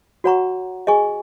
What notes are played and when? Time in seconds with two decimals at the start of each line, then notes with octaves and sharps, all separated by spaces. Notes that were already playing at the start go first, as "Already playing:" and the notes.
0.24 F#4 C#5 F#5 A#5 C#6
0.87 G#4 D#5 G#5 C#6